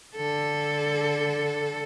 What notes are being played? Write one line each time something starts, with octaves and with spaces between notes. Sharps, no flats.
D3 A4